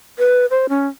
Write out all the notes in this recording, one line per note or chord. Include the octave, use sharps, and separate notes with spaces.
B4
C5
C#4